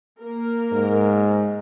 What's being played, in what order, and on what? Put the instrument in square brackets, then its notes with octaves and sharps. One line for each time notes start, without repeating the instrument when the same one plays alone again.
[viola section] A#3 A#4
[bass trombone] G#2